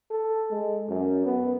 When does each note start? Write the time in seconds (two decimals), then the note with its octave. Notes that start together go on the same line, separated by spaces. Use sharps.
0.11 A4
0.51 G#3
0.89 F#2
1.25 B3